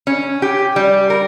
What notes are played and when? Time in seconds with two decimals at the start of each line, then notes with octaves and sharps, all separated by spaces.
0.07 C#4
0.42 G4
0.76 G3
1.10 A#4